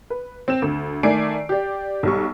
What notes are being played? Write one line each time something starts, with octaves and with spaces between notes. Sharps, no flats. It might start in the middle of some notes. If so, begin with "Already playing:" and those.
B4
C4 E7
D2
D#3 A3 D5 G#5 C7 D7
G4 D5
B1 G3 C#6